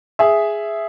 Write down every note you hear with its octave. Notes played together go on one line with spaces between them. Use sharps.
G#4 E5